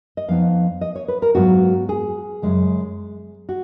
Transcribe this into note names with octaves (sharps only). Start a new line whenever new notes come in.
D#5
F2 F3 B3 D#4 F5
D#5
C#5
B4
A#4
G#2 F#3 B3 F4 F#4
G#4
F#2 C#3 G#3
F#4